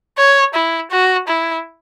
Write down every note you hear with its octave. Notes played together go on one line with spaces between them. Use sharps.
C#5
E4
F#4
E4